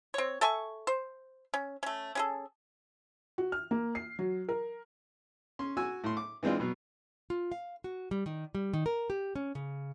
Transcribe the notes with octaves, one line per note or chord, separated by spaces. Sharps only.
C4 C#5
A4 E5 G#5 C#6
C5
C#4
A3 C#4
C#4 G#4 A4
F#4
F6
A#3
C7
F#3
A#4
C#4 C6
F#4 G#5 E6
A2 C6
D6
E3 G#3 C4 D4 F4
B2 F#3
F4
F5
F#4
G3
D#3
G3
D#3
A#4
G4
C#4
C#3